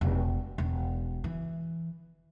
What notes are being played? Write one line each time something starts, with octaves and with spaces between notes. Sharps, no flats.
E1
E1
E3